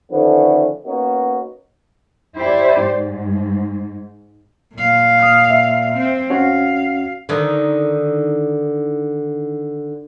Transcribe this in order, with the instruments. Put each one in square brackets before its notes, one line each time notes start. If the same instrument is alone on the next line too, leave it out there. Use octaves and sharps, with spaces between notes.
[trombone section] D3 D#3 F3 A3 B3 C#4
A#3 B3 C#4 D#4 F#4
[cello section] E4 G4 C5 D5
G#2
[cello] A#2 F5
[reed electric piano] D#6 F6
E5
[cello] C4
[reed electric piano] C#4 F#4 [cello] F5
[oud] D3 D#3